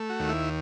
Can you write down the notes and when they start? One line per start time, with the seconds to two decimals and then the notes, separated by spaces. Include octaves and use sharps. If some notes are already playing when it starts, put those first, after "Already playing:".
Already playing: A3
0.10 F#4
0.20 D#2
0.29 E4